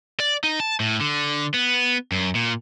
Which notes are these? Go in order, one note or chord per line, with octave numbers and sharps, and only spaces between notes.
D5
D#4
A5
A2
D3
B3
F#2
A#2